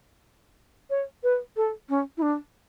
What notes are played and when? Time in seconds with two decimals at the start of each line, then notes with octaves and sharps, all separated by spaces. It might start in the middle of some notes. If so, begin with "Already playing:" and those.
0.90 C#5
1.23 B4
1.57 A4
1.89 C#4
2.17 E4
2.22 D4